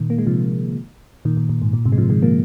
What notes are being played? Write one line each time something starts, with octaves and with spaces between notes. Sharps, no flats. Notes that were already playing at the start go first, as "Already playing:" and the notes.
Already playing: A#2 D#3
A#3
G#3
C3 F3
A#2 D#3
A#2
A#2
G#2
A#2
G#2 C3
G#3
C3 F3
D#3 G#3
F3 A#3